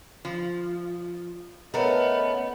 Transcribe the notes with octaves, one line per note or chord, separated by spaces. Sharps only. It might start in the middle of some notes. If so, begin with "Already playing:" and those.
F3
A3 B3 C#4 A4 A#4 D#5